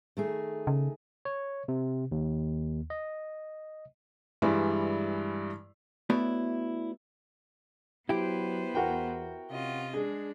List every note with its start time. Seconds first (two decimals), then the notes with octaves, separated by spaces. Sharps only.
0.17 D#3 A3 G#4
0.67 C#3
1.25 C#5
1.68 C3
2.12 D#2
2.90 D#5
4.42 G2 E3 G3 G#3 E4
6.10 A3 B3 E4 F#4 C#5 D5
8.09 F#3 B3 E4 G4 B4 C5
8.75 E2 F#4 A#4 G5
9.51 C3 C#4 F4 D#5
9.94 G#3 D4 G#4